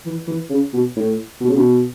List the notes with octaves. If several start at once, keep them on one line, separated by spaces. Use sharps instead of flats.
E3
E3
C#3
B2
A2
B2
C#3
B2